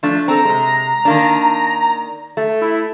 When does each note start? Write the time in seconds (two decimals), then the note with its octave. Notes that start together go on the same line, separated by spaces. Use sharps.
0.03 F3 A3 D4
0.28 C4 A4 A#5
0.45 C3 G#3
1.05 D#3 A#3 D4
2.37 A3
2.61 E4